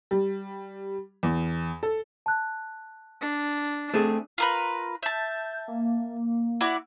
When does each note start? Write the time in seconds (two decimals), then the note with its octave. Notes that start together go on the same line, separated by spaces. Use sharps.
0.11 G3
1.23 E2
1.83 A4
2.26 A5 F#6
3.21 D4
3.94 A3 C4 G#4
4.38 F4 A#4 B4
5.03 E5 A5 G6
5.68 A#3
6.61 E4 F#4 D5